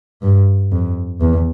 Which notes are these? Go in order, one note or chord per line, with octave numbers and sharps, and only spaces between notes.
G2
F2
E2